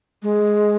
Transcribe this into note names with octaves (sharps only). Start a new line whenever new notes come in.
G#3